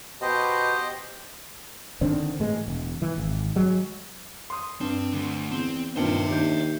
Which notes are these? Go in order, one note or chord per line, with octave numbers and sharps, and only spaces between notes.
B2 G4 C5 D#5
D3 D#3 C4 D4
A2 E3 G#3
E1
E3
G#1
F#3 G#3
C6 D#6
G2 C4
D2
E2 C4
G2 A#2 D#3 C4 E5 G5
D#2 D4 G6